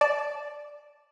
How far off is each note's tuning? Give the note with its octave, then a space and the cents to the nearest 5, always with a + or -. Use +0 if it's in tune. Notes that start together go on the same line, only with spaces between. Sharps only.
D5 +0 A5 -15